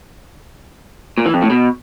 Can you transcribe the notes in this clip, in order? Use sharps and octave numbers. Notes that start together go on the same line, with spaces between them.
A#2
E3
F2
A2
B2